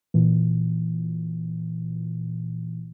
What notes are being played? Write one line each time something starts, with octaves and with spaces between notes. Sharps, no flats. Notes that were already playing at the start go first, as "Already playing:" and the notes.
A#2 E3